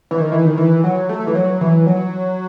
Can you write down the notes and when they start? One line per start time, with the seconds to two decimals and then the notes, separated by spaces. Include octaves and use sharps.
0.11 E3
0.20 D#3
0.32 E3
0.45 D#3
0.58 E3
0.84 F#3
1.09 A3
1.27 E3
1.35 F#3
1.61 E3
1.87 F#3